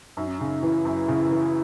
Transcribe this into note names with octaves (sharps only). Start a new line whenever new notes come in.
F#2 D#4
C#4
C#3 D#4
E3 E4
F#2
C#3
E3